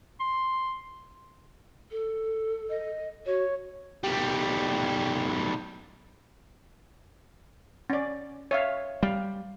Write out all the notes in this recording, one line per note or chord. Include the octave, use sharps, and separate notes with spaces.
C6
A4
D#5
F#4 C#5
B1 G3
C#4 D5
C#5 E5 F5
G3 F5